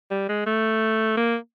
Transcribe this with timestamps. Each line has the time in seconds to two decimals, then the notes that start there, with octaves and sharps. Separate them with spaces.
0.11 G3
0.29 G#3
0.46 A3
1.17 A#3